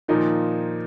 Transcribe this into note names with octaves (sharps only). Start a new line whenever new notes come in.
A#2 D#3 F3 D#4